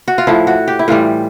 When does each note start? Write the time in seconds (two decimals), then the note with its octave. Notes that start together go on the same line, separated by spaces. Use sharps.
0.08 F#4
0.18 F4
0.27 A2 F3 E4
0.47 F#4
0.68 G4
0.79 E4
0.88 A2 E3 G3 F4